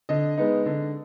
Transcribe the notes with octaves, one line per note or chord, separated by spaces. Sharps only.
D3 D#5
G#3 B3 D#4
D3